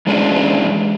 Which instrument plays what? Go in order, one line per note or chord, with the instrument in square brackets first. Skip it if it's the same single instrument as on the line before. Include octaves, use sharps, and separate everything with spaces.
[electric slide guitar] E2 G#3 C#4 D4 G#4